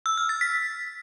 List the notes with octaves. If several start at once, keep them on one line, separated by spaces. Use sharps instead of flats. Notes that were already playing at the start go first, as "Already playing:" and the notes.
E6
F6
A6
B6